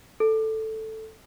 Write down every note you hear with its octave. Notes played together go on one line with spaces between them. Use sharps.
A4